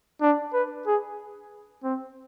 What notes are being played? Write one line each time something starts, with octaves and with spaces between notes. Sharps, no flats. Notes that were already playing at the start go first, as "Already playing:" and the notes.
D4
B4
G#4
C4